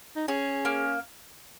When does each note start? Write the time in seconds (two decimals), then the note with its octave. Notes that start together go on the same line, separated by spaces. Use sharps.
0.16 D#4
0.28 C#4 G#4
0.65 A#3